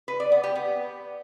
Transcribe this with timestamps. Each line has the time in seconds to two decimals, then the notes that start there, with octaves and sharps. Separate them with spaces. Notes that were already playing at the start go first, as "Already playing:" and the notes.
0.08 B4
0.20 D5
0.32 B3
0.44 G4
0.55 B3